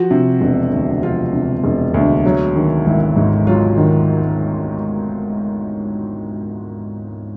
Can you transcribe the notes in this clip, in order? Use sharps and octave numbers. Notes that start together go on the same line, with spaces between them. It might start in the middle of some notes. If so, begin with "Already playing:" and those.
Already playing: F3 F#4
C3
E1
D2
F3 F4
C3
E1
D2
F#3
D#3
G#1 E4
G#2
F#3 F4
D#3